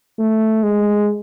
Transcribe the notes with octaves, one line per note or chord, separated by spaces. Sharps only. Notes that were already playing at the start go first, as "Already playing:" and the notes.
A3
G#3